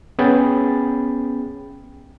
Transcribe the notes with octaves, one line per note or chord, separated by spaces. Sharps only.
B3 C#4 G#4 G5 B5 A6